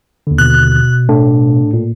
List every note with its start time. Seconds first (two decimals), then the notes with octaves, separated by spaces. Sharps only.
0.27 D#2 D3
0.38 B2 F#6
1.09 A2 D4
1.73 A#2